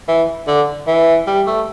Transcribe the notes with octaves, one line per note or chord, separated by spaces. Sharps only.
E3
D3
E3
G3
A3